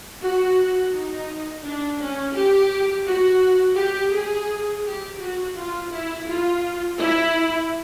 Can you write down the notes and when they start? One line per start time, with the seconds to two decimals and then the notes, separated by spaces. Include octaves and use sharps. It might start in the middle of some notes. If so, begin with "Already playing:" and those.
0.21 F#4
0.93 D#4
1.64 D4
2.00 C#4
2.35 G4
3.06 F#4
3.77 G4
4.14 G#4
4.84 G4
5.20 F#4
5.55 F4
5.92 E4
6.26 F4
6.98 E4